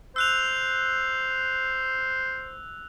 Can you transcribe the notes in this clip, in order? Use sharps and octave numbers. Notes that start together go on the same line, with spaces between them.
C5 E6 F#6 F7